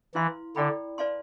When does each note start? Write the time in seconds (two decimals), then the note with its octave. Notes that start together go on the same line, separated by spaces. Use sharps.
0.15 E3 E4 B4 F5 C6
0.56 D3 E4 A4 D5 G5 B5
0.98 B4 D5 F5 A5 C6